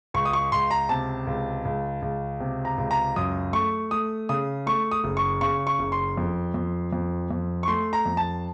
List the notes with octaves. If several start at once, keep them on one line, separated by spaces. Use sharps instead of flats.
C#2 C#6
D#6
C#6
C#2 C6
A#5
C3 A5
C#2
C#2
C#2
C3
A#5
C#2
A#5
F#2 D#6
A3 C#6
A3 D#6
C#3 D#6
A3 C#6
D#6
F#1
C#6
C#3 C#6
C#6
F#1
C6
F2
F2
F2
F2
C#6
A3 C6
A#5
F2
A5